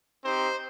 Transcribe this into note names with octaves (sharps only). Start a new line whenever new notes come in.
C4 D#4 G4 C5